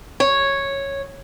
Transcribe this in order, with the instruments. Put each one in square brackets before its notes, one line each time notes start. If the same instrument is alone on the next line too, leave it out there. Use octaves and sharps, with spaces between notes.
[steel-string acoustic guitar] C#5